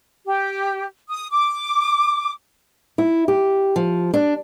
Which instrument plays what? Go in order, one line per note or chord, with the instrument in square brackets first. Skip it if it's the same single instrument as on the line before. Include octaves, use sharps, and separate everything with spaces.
[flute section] G4
D#6
D6
[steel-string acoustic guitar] E4
G4
F3
D4